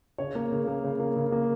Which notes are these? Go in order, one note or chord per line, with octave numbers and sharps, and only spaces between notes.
C#3 C#5
A#3
C#3
A#3
C#3
A#3
C#3
A#3